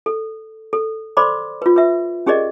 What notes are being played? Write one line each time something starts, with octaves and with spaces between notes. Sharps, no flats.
A4
A4
A4 C5 D5 B5 C6 D6
F4 B4
B4 E5
C#4 G4 G#4 A#4 D5 D#5